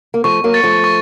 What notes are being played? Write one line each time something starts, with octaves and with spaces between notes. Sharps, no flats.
A#3
F3 A3 C#6
F#3 A#3
A6 C#7
F3 A3
C#6